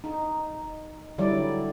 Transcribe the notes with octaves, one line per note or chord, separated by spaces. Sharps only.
D#4
D3 F#3 G3 E4 D5